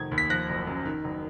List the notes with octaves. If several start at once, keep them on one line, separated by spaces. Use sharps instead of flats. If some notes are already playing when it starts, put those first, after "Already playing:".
Already playing: F1 D#3 G#6
D#2
B6
F3 F#6 A#6
F#1
F#2
D#3
F#1